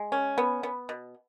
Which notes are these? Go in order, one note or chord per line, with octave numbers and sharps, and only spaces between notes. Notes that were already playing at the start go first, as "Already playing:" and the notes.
Already playing: G#3
C#4
B3
B3
B2